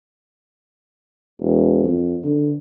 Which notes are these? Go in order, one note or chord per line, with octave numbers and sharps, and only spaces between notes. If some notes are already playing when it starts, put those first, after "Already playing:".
E1
F2
D3